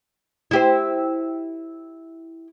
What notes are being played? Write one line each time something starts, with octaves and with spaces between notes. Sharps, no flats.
E4 G4 C5